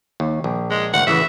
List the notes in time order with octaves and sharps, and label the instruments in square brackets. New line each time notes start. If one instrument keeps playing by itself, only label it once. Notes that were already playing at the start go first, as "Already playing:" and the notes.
[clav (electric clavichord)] D#2
A#1
[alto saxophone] G#3
[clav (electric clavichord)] G#1 D2 [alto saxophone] F#5
[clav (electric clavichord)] A1 C#3 E3 [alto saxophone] E5